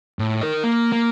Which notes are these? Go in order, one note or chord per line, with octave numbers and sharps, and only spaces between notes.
A2
A#4 D#5
A#3
A#3